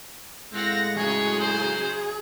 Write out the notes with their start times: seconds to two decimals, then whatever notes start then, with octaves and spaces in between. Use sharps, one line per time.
0.53 A2 G#3 C4 F5 F#5 A#6
0.97 C#3 F#3 D#4 G#4 C#5
1.40 C5